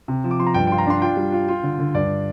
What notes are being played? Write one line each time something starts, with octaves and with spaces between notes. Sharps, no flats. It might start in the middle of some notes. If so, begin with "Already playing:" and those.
C3
F3
D6
F3 C6
A#5
G2 G5
F4 G5 C6
A#5
D4 C6
F4 G5
G3
F4
F4
D3
D3
G2 D5